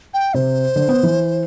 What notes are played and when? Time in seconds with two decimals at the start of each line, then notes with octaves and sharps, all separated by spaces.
0.14 G5
0.34 C3 C5
0.76 D3
0.89 B3
1.03 E3